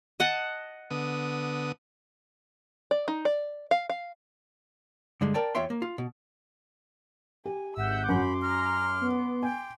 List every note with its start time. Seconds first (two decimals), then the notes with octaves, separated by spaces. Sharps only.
0.20 D#5 F#5 A5
0.90 D3 B3 D#6
2.91 D5
3.08 D#4
3.25 D5
3.71 F5
3.90 F5
5.21 G2 D3 G#3
5.34 A#4 D5 G5 A5
5.55 E2 F4 C#5 E5 G5 C6
5.70 A#3
5.82 F4
5.98 B2
7.46 G4 G#5
7.77 G#1 E5 F#5 E6 G6
8.09 F#2 F#3 B5 C6 D6
8.42 A#5 F6
9.01 B3
9.43 G5 G#5